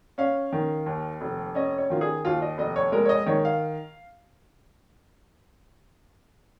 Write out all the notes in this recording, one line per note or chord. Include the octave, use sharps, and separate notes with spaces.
C#4 F5
D#3
D#2
F1
C#4 D#5
C#5
D#3 F4
G#4
D#2 F4
D#5
F1 D#5
C#5
G#3 A#4
C#5
D#5
D#3 C#5
F5